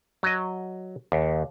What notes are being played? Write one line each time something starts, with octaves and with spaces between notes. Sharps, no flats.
F#3 D#5
D#2